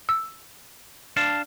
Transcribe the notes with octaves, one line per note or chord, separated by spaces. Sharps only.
E6
D4 F5 A5